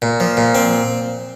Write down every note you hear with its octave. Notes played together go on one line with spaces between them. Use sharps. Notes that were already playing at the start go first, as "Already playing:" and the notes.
A#2
F3
A#2
C4